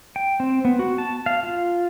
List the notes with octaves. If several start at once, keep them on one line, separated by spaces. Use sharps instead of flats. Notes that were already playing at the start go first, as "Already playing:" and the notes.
G5
C4
B3
F#4
A5
F5
F4